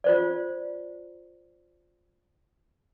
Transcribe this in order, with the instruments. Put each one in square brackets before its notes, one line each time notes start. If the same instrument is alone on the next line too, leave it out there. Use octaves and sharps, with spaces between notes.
[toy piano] F4 C5 D5